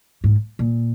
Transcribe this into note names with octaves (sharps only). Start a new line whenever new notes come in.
G#2
A#2